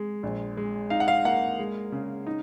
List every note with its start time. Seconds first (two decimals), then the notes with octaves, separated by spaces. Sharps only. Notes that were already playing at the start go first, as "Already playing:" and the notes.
Already playing: G#3
0.23 A#1
0.57 G#3
0.90 D#4 F5
1.00 F#5
1.08 F5
1.25 A#3 F#5
1.59 G#3
1.92 C#3
2.27 D#4